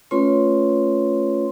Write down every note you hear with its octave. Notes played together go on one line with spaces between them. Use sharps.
A3 C#4 F4 B4 C#5 C6